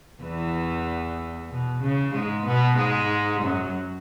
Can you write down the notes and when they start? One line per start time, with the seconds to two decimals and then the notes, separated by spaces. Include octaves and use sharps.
0.22 E2 E3
1.50 B2
1.81 C#3
2.14 G#2 G#3
2.46 B2 B3
2.77 G#2 G#3
3.41 F#2 F#3